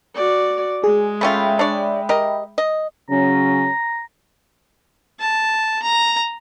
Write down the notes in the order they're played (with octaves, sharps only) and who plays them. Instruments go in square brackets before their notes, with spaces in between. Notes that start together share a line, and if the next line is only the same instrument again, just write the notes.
[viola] F#4 D5
[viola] G#3 [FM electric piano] G#4
[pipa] A3 C#4 F4 [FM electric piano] E5 G5 B5
[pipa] D4 C#5 D5
G4 A#4 D#5
D#5
[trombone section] C#3 F#3 C#4 [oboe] A#5
[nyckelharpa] A5
A#5